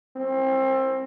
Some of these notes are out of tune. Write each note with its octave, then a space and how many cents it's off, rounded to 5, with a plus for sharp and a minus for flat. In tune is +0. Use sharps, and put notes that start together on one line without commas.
C4 +25